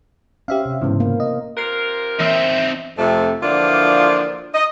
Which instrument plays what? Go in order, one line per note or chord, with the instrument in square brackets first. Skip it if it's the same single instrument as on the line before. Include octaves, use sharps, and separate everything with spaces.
[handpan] C#4 C5 [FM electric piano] G4 E5 F5
[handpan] C3
[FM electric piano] G#2 C#3 E3 [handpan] B3 E4 C5
[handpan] A#3 F5
[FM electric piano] D#5
[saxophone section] C3 F4 A#4 [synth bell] F#6 C7
[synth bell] E3 E6 [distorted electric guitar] C4 D#4 [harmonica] E5
[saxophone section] F2 C3 A3
D3 E3 F3 A#3 D4 F4
D#5